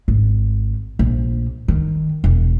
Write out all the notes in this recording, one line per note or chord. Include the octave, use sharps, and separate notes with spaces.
G#1
A#1
D#3
E1